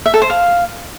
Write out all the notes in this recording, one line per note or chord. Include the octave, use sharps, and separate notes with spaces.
E5
A4
C5
F5